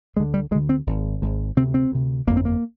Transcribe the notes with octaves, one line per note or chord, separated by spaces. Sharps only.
D2 D3 G#3
G3
D2 D3 G#3
C4
G#1 G#2
G#1 G#2
D2 C3 C4
C4
D2 C3
G1 F2 D3 A#3
C4
A#3